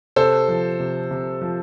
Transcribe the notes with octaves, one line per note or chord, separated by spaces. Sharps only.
C3 A4 C5
F3
C3
C3
F3